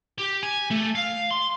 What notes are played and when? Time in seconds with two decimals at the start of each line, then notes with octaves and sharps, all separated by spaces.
0.18 G4
0.43 G#5
0.71 A3
0.95 F5
1.31 C6